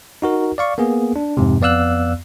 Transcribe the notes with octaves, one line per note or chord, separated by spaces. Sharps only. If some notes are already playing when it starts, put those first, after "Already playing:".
D#4 F#4 A#4
D5 F5 C#6
A#3 B3 G#4
D4
F2 G#2 C3
F2 B3 D5 F5 E6 F#6